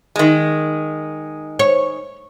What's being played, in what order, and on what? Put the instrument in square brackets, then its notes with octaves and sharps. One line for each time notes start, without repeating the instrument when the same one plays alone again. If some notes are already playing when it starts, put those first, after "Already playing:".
[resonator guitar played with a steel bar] D#3 G#3
[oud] C#5